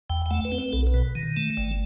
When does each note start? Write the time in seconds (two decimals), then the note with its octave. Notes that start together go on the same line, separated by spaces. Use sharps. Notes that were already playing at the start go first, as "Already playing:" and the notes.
0.10 E2 G5
0.26 G5
0.31 A3 F#5
0.45 B4
0.52 C4
0.58 B4
0.73 B1 A4
0.87 B4
0.94 B2
1.15 D#3
1.37 A3
1.57 G1